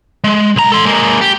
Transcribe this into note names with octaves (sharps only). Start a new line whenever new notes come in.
G#3
B1 A#5
A4 C6
G#3 A#3
G4